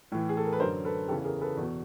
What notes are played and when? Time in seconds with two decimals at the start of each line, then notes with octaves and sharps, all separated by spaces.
0.12 A2 E3
0.29 G#4
0.37 A4
0.45 A#4
0.53 B4
0.60 F#2 D3 A#4 C5
0.85 A4 B4
1.08 E2 C#3 E3 G4 A4
1.25 G#4 A#4
1.41 A4 B4
1.57 E2 B2